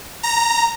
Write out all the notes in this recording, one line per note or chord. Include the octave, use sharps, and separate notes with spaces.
A#5